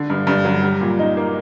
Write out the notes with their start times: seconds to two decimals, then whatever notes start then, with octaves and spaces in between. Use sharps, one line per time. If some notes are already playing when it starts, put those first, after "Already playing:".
Already playing: D3
0.10 G2
0.27 G2
0.45 F#3
0.63 G3
0.81 A#2
0.99 D#4
1.17 A#3